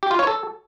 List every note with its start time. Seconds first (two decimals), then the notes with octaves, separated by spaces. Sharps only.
0.03 G4
0.11 F4
0.19 C#5
0.27 A4